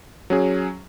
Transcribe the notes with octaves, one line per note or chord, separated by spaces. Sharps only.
F#3 C#4 G#4